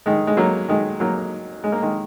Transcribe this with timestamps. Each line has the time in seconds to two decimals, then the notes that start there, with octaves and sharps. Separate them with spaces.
0.06 D#3 G#3
0.27 G#3
0.37 F#3 A#3
0.68 D#3 G#3
1.00 F#3 A#3
1.64 G#3
1.72 A#3
1.82 D#3 G#3